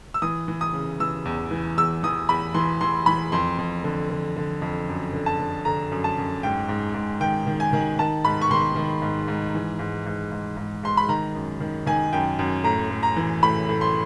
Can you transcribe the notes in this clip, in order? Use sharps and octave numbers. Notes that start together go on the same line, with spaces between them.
E6
E3 D#6
E3
D#6
C#3
E3 E6
E2
E3
E2 E6
E3 D#6
E2 B5
E3 C6
E3 C6
E3 B5
F2 C6
F2
D3
D3
D3
F2
F#2
D3
A5
D3
D3 A#5
F#2
A5
F#2
G#2 G5
G#2
G#2
D#3 G5
D#3
G#5
D#3
D#3 A5
G#2 B5
C#6
D#3 C6
D#3
G#2
G#2
E3
G#2
G#2
G#2
G#2
G#2 C6
B5
D#3 A#5
F#2
D#3
D#3 G#5
F#2 G5
F#2
A2 A#5
A2
A#5
E3
A2 B5
A2
C6